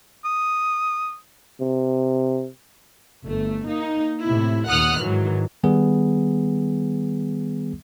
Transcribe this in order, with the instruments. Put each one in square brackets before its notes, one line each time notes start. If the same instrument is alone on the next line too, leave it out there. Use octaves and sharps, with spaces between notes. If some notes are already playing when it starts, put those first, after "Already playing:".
[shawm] D#6
[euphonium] C3
[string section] G1 A3
A#3 D#4
A2 C3 E4
D#2 A#2 F#5 D#6 F6 F#6
G#2 D#3 E3 F#3
[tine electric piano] D#3 G3 B3 G#4